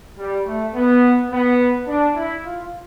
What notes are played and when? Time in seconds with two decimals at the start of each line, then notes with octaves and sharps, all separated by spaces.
0.18 G3
0.46 A3
0.74 B3
1.31 B3
1.87 D4
2.15 E4
2.44 F4